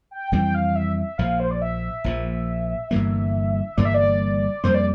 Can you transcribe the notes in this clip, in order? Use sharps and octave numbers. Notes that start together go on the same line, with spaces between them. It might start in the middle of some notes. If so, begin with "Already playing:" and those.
G5
F2 E3 G3 C4 G5
F5
E5
E5
A#1 A#2 F3 F5
C5
D5
E5
A#1 A#2 F3
G1 G2 E3 A#3
G1 G2 E3 A#3 D5
E5
D5
F2 C3 G3 A#3 C5
D5